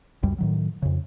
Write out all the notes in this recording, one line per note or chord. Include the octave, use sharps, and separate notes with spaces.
C#2 F#2 G3
A2 D#3 F#3
F2 C#3